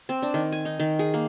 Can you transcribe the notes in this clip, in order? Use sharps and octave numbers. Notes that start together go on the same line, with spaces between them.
C4
D4
D#3
G#5
D#4
D#3
G#4
A#3